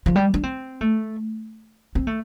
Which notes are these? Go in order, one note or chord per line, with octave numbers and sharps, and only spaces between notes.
F3
G3
D4
C4
A3
C4
A3